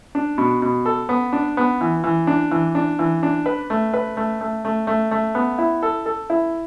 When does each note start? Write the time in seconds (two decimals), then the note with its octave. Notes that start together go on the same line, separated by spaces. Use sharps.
0.15 D4
0.38 B2
0.62 B2
0.85 A4
1.09 B3
1.33 D4
1.57 B3
1.81 E3
2.04 E3
2.27 D4
2.51 E3
2.75 D4
2.99 E3
3.23 D4
3.46 B4
3.70 A3
3.94 B4
4.17 A3
4.41 A3
4.65 A3
4.87 A3
5.11 A3
5.35 B3
5.58 E4
5.83 A4
6.06 A4
6.30 E4